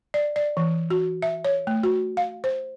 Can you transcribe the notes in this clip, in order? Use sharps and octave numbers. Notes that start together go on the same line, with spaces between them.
D5
D5
E3
F#4
E5
C#5
A3
F#4
F5
C5